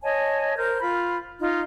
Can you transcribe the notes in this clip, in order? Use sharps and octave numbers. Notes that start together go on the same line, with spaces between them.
C#5 D#5 G#5 A5
A#4 C5 G6
F4 B5
D#4 F4